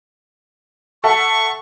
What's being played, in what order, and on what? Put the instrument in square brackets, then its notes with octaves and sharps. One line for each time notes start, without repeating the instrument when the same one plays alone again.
[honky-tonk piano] A4 E5 F#5 [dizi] C#6